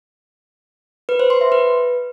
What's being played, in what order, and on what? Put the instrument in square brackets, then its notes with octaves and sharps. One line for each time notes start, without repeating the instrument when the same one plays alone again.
[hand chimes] B4
C5
C6
E5
B4